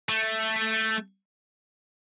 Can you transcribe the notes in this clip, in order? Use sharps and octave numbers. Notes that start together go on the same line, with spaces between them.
A3